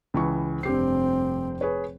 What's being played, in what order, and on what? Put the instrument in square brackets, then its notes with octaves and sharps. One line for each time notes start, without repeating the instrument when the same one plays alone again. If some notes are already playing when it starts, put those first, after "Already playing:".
[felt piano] C#2 E3 C#6
[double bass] F1 C4 [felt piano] G2 G4 C7
[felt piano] G#4 B4 C#5